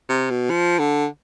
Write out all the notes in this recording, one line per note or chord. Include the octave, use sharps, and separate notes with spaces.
C3
B2
F3
D3